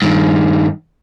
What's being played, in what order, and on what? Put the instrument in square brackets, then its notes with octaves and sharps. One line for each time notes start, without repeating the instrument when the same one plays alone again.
[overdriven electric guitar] G2 D#3